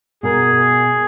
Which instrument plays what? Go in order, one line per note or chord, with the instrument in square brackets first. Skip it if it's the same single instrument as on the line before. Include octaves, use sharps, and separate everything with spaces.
[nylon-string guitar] B2 A#4 [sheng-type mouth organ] G#4